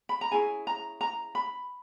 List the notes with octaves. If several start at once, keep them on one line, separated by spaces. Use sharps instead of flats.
B5
A#5
C#4 E4 G#4 G#5
A#5
A#5
B5